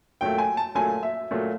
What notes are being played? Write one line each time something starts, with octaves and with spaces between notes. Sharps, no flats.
A#2 F#3 A3 G5
G#5
A5
A#2 F#3 A3 G#5
E5
A#2 F#3 A3